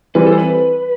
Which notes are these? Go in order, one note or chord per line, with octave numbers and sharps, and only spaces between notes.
E3 G3 C4 B4
A4
C5
B4